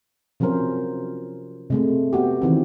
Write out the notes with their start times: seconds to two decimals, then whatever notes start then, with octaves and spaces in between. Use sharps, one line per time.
0.40 C3 F3 F#3 C#4 A#4 C5
1.70 C3 G#3 A3
2.13 B3 F#4 G4
2.42 D#3 E3 C4